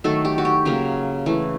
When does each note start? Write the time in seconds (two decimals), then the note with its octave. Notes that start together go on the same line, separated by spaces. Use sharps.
0.04 D#3 F#3 A3 A4
0.25 G4
0.38 F#4
0.45 G4
0.65 C#3 F#3 A#3
1.26 E3 A3